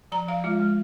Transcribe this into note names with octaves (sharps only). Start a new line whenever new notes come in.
F3 A#5
F3 F5
G#3 F4
G#3